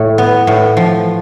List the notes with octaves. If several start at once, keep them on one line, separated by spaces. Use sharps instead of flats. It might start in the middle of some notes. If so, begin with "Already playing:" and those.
Already playing: A2
B3
A2
F3